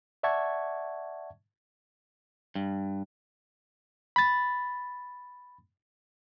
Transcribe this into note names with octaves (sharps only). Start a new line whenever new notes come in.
D5 E5 F#5 A5 C#6 G#6
G2
B5 A6